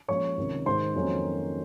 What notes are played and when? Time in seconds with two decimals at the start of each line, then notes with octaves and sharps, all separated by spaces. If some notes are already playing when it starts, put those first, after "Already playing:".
0.08 A#2 F3 G#3 C#4 C#5 C#6
0.37 C#2 C3 D#3
0.66 G#2 D#3 G#3 C5 C6
0.95 F2 D#3 F#3 A#3 C#4